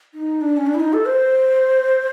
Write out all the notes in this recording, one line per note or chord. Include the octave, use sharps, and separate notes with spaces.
D#4
D4
C#4
D4
E4
D#4
A4
C5